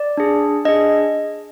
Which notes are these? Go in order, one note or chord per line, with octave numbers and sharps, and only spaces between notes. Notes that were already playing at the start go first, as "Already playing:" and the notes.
Already playing: D5
D4 G#4
D4 G#4 D#5